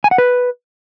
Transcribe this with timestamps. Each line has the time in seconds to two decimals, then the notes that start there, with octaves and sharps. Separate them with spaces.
0.04 G#5
0.11 F#5
0.18 B4